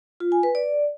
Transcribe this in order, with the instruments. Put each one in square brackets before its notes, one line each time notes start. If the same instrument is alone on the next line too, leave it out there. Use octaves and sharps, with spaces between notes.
[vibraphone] F4
G#5
B4
D5